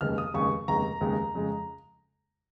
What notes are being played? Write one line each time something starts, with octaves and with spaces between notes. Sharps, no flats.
F1 D#2 C#3 G#3 F6
D#6
F1 D#2 C#3 G#3 C#6
F1 D#2 C#3 G#3 A#5
F1 D#2 C#3 G#3
F2 C#3 G#3